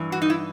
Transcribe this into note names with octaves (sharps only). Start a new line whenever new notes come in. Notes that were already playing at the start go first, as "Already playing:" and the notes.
Already playing: G2 E3
F#4
D#4
E4